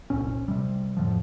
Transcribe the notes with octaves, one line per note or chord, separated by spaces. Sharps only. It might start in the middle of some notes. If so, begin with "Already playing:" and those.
F#1 C2 A#2 C#4
C3 G3
F2 A2 D3 F3